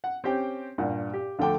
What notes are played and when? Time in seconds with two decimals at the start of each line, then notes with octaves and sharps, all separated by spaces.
0.04 F#5
0.24 C4 C#4 G4 G5
0.78 G2 A#2 F#5
1.14 G4
1.39 D2 D3 F3 A3 G5 D6